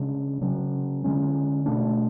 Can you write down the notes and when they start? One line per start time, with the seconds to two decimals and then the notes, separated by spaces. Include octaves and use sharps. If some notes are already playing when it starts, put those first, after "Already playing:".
Already playing: C#3 G#3 D4
0.41 C#3 F#3 C#4
1.04 D3 G#3 C#4
1.66 B2 A3 D4